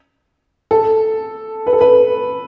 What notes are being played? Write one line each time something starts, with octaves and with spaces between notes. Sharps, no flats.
A4
B4
A4
B4